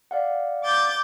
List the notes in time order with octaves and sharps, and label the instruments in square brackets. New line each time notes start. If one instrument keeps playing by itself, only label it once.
[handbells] D5 F5 F#5
[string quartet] D6 G6 A6